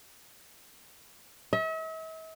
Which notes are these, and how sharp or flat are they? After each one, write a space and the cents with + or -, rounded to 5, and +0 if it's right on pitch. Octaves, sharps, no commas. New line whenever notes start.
E5 -45